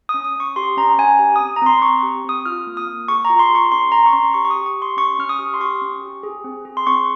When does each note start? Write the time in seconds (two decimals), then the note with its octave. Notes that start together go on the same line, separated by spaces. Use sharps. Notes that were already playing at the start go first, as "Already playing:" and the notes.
0.09 D#6
0.14 C#4
0.24 D#6
0.36 C#4 C#6
0.56 G4 C6
0.77 C#4 A#5
0.98 C#4 G#5
1.19 G4
1.36 D#6
1.40 C4
1.56 A#5
1.62 C4 C6
1.82 C4 C#6
2.03 G4
2.24 C4 D#6
2.46 F4 F6
2.67 A#3
2.77 D#6
2.87 A#3
3.08 G#4 C#6
3.25 A#5
3.30 F4
3.39 C6
3.50 G#4
3.55 C#6
3.72 C#4 C6
3.92 C#4 A#5
4.06 C#6
4.13 C#4 C6
4.34 G4 C#6
4.45 C#6
4.50 D#6
4.55 G4
4.66 C#6
4.77 G4
4.82 C6
4.97 C#4 C#6
5.19 C#4 F6
5.29 D#6
5.39 G4
5.54 C6
5.60 G4 C#6
5.81 C#4
6.02 G4
6.23 G#4
6.44 C4
6.65 G#4
6.77 C6
6.87 C4 C#6